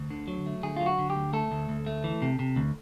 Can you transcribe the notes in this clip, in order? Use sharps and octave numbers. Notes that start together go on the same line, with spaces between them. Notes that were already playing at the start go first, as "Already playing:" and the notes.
Already playing: D2
D3
F#3
A3
D3 G#4
F#3 F4
F#4
D3
G4
D2
A3 A4
D2
D2
A3
E3
C3
C3
D2